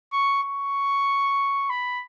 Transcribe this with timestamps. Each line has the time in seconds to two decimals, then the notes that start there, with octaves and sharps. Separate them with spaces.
0.13 C#6
0.44 C#6
1.70 B5